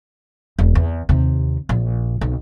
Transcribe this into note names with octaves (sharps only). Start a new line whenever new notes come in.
E1 B2
E2
D#2 C3
A#1
B1